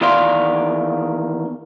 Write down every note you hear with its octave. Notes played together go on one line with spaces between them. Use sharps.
E2 D#3 D5 F5 C6